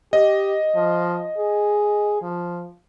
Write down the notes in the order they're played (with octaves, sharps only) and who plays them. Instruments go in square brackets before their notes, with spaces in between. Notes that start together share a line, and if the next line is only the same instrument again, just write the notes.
[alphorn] G4 [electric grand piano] D#5
[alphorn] F3
G#4
F3